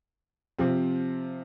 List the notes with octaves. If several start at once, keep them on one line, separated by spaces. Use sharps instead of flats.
C3 F3 C4